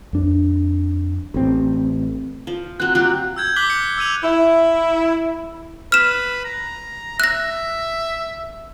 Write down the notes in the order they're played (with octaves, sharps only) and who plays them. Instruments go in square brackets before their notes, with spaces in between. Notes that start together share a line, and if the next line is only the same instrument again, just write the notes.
[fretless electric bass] F2 D4
A1 C4
[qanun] F3
[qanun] F#3 C4 [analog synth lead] F#6
[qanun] F#3 F4 G4
[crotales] E6 G6 G#6
D6 F#6 B6 F#7 G7
C#7
E6 G#6 D#7 F7
[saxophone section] E4
[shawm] B4 [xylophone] F6 E7
[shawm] A#5
[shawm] E5 [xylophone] F#6 A#6